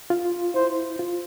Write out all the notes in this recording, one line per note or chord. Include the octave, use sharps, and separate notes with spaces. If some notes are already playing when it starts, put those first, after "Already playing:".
F4
E4 C5
F4